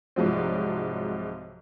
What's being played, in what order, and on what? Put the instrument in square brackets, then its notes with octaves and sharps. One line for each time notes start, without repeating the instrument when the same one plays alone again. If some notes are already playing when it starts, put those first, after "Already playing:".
[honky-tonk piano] C2 G#2 F3 F#3 C4